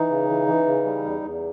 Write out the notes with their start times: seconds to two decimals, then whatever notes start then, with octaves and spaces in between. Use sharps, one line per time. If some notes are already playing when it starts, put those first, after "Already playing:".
Already playing: E3 D#4
0.10 C#3
0.29 E3
0.47 E3
0.66 C#3
0.85 G3
1.04 E2
1.23 E2